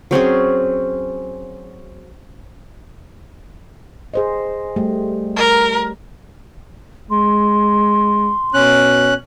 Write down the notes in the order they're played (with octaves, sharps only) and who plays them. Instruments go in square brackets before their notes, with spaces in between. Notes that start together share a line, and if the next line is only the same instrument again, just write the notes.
[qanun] F#3 C4 C#4 G#4
[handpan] G#4 C5 D#5
G3 A3 G4
[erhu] A#4
[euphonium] G#3 [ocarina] C6
[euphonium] B2 [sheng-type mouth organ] C#4 F#6